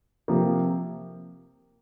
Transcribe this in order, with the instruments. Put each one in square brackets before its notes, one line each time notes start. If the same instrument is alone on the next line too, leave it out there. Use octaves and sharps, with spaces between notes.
[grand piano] C3 F3 A#3